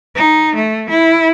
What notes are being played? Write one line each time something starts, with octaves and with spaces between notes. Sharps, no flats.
D#4
A3
E4